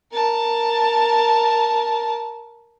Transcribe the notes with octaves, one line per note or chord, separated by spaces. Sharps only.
A#4 A5